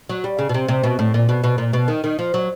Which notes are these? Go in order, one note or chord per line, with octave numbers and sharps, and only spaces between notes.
F#3
G3
C#3
B2
C3
C3
B2
A2
A#2
B2
B2
A#2
B2
D#3
D#3
F3
F#3